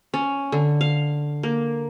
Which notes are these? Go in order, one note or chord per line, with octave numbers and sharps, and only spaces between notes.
C#4
D3
F5
A#3